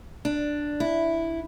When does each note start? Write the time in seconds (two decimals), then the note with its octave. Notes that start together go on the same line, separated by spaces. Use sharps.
0.25 D4
0.80 E4